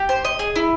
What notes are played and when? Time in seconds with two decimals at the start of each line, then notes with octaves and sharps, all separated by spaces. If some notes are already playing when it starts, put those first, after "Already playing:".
Already playing: G4
0.09 C5
0.25 D#5
0.39 G#4
0.56 E4